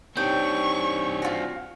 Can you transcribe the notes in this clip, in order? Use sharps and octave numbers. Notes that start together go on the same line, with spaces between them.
C4 D4 D#4 G4 C#5 G5 C#6
F4 F#4